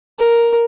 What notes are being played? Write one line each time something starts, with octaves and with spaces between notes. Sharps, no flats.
A#4